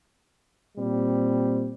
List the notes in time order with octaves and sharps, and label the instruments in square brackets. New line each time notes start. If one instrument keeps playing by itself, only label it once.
[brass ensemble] A#2 G3 C4